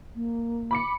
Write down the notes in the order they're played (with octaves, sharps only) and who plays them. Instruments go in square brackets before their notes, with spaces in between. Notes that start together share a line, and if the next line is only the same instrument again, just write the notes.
[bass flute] A#3
[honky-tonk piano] B5 D6 C#7